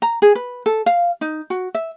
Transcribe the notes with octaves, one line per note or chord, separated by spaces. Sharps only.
A#5
G#4
B4
A4
F5
D#4
F#4
E5